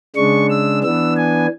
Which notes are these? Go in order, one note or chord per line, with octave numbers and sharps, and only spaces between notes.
C#3 G#3 D4 C#6
E6
E3 B3 D4 E6
G#5